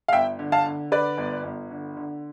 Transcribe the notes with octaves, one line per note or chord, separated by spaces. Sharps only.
F5
G1 E5 G5
D3
F5 A5
D3
D3 B4 D5
G1
G1
D3
D3